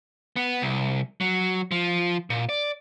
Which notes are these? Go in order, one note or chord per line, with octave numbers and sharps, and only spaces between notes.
B3
C2
F#3
F3
A#2
D5